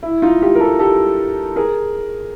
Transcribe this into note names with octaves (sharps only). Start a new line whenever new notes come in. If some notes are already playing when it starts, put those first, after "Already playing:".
E4
D#4 F4
F4 G4
A#4
G4 A4
G4 A4
G#4 A#4